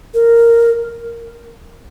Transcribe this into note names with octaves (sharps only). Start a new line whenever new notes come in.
A#4